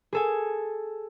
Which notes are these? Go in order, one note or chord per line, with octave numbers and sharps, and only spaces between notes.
G#4 A4 G#5